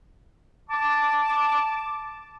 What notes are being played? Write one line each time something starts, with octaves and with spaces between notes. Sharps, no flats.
A5 D6